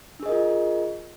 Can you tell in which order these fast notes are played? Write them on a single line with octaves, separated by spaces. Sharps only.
D4 G#4 D#5 A#4 F4